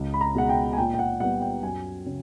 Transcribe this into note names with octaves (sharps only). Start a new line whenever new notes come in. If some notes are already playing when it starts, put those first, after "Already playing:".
Already playing: C#2
B5
A#5
B2 G#3 F#5
G5
G#5
A#2 G5
G5
F#5
G3 B3 F#5
G5
F#2 G#5
C#3